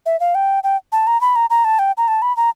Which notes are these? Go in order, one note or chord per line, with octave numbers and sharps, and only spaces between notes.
E5
F5
G5
G5
A5
A#5
B5
A#5
A#5
A5
G5
A#5
A5
B5
A#5